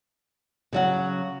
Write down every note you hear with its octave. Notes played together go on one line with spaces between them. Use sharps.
C#3 F#3 F#5